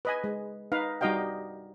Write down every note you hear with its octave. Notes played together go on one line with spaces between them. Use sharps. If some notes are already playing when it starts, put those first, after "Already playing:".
B4 D#5 G#5
G#3
D#4 B4 F5
G3 D#4 F#4 D#5 F5 G5